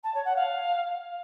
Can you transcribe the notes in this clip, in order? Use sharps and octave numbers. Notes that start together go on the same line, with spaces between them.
A5
C#5
F#5
F5